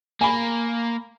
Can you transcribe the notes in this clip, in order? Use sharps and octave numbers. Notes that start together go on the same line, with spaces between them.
A#3 G#5 B5